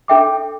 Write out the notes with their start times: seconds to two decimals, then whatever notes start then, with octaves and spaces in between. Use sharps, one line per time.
0.08 D4 A4 E5 G5 D6